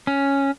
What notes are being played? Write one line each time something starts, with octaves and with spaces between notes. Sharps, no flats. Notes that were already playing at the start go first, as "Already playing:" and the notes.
C#4